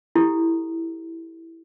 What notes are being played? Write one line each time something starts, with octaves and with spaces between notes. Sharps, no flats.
E4 G4 A4